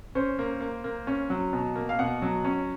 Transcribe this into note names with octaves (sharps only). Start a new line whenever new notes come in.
C#4 C5
A#3
A#3
A#3
C#4
F#3
B2
A#3
F5
B2 F#5
F#3
C#4